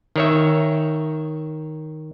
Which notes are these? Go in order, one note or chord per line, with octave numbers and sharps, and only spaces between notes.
D#3 C#5 E5